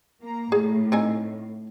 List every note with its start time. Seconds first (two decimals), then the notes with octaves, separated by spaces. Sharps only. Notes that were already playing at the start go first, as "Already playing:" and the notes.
0.21 A#3 A#5
0.52 A2 G#4
0.92 C4 D#4 G#5